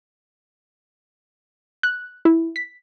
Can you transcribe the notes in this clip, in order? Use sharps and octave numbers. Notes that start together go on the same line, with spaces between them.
F#6
E4
B6